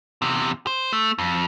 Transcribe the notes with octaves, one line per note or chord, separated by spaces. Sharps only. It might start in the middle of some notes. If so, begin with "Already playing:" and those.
E2 C3
C5
A3
F2